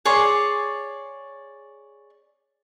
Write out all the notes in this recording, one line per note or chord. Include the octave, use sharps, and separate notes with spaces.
G#4 C#5 D5 C6